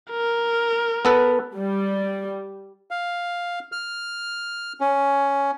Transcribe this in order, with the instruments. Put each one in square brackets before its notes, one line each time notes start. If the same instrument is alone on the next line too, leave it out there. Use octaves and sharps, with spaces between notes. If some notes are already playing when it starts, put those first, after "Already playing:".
[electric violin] A#4
[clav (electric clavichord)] B3 A4 B4
[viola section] G3
[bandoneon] F5
F6
C#4